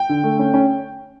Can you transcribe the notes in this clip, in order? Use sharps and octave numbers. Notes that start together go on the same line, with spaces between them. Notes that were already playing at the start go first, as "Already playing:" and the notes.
Already playing: G5
D3
A3
C#4
C#4